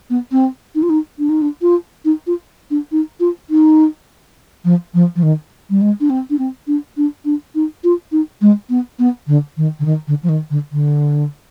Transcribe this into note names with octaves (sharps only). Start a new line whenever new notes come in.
B3
C4
D#4
F4
D#4
D4
D#4
D4
F4
D#4
F4
D4
D#4
F4
D#4
F3
F3
F3
D#3
G3
G#3
D4
C4
D4
C4
D4
D4
D4
D#4
F4
D#4
G#3
B3
B3
D3
D#3
D3
D#3
D3
F3
D#3
D3
D3